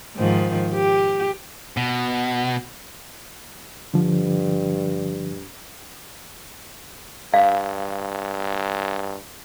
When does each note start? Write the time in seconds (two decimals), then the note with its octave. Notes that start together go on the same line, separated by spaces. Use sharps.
0.16 G#2 D#3 F3
0.74 G4
1.77 B2
3.94 G2 D3 F3
7.34 G2 F5